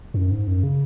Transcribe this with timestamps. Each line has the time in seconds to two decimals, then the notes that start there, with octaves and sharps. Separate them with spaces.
0.14 F#2
0.31 G#2
0.47 F#2
0.63 C#3